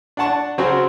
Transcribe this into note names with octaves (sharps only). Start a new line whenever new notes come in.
D4 D5 F#5 A5 C#6
C#3 F#3 C4 F#4